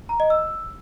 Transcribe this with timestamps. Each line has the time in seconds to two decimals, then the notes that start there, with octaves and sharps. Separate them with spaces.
0.09 A#5
0.20 D#5
0.30 E6